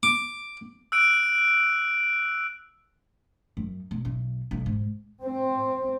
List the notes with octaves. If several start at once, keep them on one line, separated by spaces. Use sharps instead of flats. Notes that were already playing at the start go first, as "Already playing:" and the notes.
D6
E6 F#6 D7
F#2
B2
B1
B1
G#2
C4